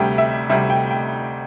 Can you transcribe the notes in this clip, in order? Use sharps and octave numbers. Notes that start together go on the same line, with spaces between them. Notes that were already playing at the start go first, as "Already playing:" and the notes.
Already playing: D2 C3 G3 G5
E5
D2 C3 G3 E5
G5
G5